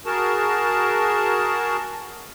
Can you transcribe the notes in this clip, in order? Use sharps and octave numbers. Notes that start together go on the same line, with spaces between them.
F#4 G#4 A#4 A5